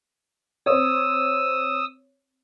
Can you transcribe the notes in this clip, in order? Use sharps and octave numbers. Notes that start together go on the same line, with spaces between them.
C4 C#5 D#6 E6